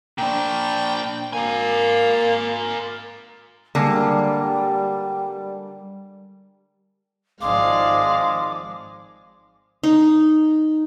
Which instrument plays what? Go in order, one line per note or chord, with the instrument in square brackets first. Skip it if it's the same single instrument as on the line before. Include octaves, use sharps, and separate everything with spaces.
[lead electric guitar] A#2 D4 [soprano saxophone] G5
[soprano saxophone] A#3 [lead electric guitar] A#4 G#5
[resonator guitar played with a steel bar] D3 G#3 A#3 [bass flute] G3
[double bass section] G#1 F3 [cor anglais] G#3 [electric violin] D5 F5 [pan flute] D6
[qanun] D#4